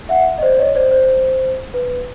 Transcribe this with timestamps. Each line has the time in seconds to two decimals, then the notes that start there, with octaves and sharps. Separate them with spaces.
0.09 E5 F#5
0.38 D#5
0.42 C5 D5
0.58 C#5 D#5
0.75 C5 D5
0.92 C5
1.74 B4